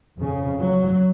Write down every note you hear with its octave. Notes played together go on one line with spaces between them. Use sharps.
F2 C#3
F#3